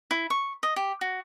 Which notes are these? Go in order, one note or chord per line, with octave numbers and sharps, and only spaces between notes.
E4
C#6
D#5
G4
F#4